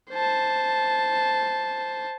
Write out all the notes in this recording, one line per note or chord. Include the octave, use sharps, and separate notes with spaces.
C5 A5